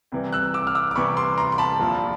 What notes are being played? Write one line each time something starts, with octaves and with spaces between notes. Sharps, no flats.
C2 C3 E3 G3
E6 F#6
D6 E6
F6
D6 E6
D6
C2 C3 E3 G3 B5 C#6
C6 D6
A#5 C6
C6
A5 B5
A#1 A#2 F3